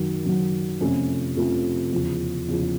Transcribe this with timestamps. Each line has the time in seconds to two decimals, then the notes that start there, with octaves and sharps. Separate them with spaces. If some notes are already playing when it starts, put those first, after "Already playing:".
Already playing: F#2 D#3 F#3
0.25 F#2 D#3 F#3
0.81 F2 C3 F3 A3 C#4
1.36 F2 C3 F3 A3 C#4
1.92 E2 C#3 F3
2.48 E2 C#3 F3